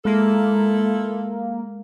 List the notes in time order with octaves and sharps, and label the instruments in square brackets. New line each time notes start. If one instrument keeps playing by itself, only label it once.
[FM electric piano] G#3 [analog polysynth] A#3 [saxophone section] E4 F4 A4